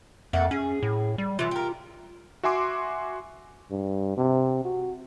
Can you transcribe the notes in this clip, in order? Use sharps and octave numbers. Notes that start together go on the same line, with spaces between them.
F2 A3 A#3 F#5
C#4 G#4
A2
G3
E3 F#3 F4
G4 A#4
F#4 E5 G#5 C6 D6
G2
C3
F#4